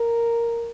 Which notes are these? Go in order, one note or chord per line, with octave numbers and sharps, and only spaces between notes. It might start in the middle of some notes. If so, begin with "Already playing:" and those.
Already playing: A#4